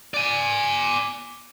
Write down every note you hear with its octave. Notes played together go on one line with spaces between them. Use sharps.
D5 G#5